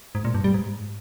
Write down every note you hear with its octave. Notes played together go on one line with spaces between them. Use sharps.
G#2
A#2
G2
G3
G#2